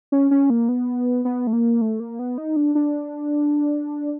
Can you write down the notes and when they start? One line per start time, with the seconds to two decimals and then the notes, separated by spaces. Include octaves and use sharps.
0.12 C#4
0.31 C#4
0.50 A#3
0.69 B3
1.25 B3
1.47 A3
1.53 A#3
1.81 A3
2.00 A#3
2.19 B3
2.38 D#4
2.56 D4
2.75 D4